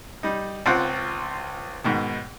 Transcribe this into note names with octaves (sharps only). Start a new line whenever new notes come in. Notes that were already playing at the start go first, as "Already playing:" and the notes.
G3 D#4
C#2 C4 F4 F#5 G5
G#2 B2 D#3